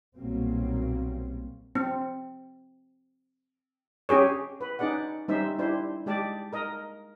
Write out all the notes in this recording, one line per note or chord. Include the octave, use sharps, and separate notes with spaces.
B1 A#2 F#3 G3 A#3 C4
C4
C#4 G4 G#4 C#5
B4
C#4 D#4 G#4 D5 F#5
G3 C#4 D#4 C5 E5
D4 E4 G4 C5
G#3 G4 D5 A5
A#4 D#5